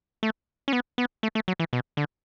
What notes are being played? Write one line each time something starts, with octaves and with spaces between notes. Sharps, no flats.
A3
C#4
B3
B3
A3
A3
F#3
E3
B2
D3